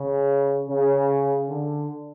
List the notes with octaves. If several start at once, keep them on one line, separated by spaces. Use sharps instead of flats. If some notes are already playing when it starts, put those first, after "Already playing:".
Already playing: C#3
C#3
D3